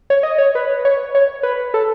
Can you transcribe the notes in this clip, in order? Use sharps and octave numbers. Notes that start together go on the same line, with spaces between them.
C#5
D#5
C#5
B4
C#5
C#5
B4
A4